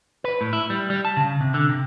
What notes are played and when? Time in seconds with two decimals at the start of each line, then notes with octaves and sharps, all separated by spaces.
0.24 B4
0.41 A2
0.53 E4
0.70 G3
0.90 G3
1.05 A5
1.17 C#3
1.41 C3
1.54 D3
1.69 C3